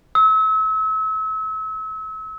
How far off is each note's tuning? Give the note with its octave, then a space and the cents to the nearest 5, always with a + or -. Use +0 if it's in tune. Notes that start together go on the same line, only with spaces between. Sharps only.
E6 -35